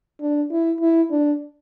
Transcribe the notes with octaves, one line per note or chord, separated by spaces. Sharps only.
D4
E4
E4
D4